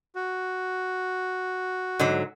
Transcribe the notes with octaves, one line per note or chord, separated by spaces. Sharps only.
F#4
G#2 D3 F#3